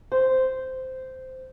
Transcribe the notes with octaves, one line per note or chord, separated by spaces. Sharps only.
C5